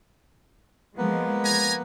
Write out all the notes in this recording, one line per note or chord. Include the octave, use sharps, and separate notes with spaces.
F3 G#3 A#3 B3 B4
G#5 A#5